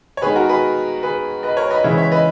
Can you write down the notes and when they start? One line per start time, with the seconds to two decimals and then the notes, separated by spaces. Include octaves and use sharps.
0.17 C#5
0.22 D#3 G#3 B3 G#4 B4
0.36 F#4 A#4
0.49 G#4 B4
1.03 G#4 B4
1.43 B4 D#5
1.57 A#4 C#5
1.70 B4 D#5
1.84 C#3 E3 G#3 B3 C#5 E5
1.98 C#5 E5
2.11 B4 D#5